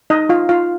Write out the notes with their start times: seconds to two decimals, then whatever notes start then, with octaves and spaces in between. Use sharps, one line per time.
0.10 D#4 D#5
0.29 F4 F5
0.49 F4 F5